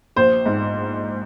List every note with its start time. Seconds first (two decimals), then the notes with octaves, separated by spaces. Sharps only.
0.16 A#1 C5
0.46 G#2